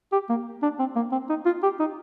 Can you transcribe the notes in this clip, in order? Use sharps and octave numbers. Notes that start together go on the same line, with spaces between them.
G4
A#3
D4
C4
A#3
C4
D#4
F4
G4
D#4